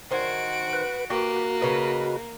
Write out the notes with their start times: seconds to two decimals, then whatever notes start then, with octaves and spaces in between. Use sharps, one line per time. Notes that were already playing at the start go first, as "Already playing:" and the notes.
0.11 D#3 F#4 C5 G#5 D7
0.73 B4
1.10 A#3 F#4 G4 B4
1.61 C#3 B4 D#5